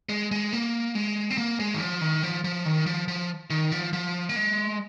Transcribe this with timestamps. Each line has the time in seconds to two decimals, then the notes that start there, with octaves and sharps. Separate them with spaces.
0.09 G#3
0.32 G#3
0.53 A#3
0.95 G#3
1.30 C4
1.38 A#3
1.60 G#3
1.74 D#3
1.80 F3
2.01 D#3
2.23 F3
2.44 F3
2.66 D#3
2.86 F3
3.08 F3
3.50 D#3
3.72 F3
3.93 F3
4.29 A#3
4.36 G#3